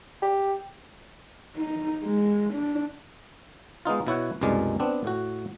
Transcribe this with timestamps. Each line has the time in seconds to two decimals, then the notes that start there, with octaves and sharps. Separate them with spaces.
0.22 G4
1.56 D#4
2.04 G#3
2.53 D4
3.85 G#3 B3 D#4 F4
4.07 B2 E4 C#5 F#5
4.41 C2 F#2 B2 G#3 D5
4.80 B3 C4 D4
5.04 A2 F#4